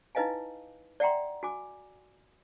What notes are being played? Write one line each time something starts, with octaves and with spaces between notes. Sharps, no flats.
D#4 E4 B4 D#5 F5 G#5
D5 E5 F#5 G5 A#5 C6
F#4 G#5 D6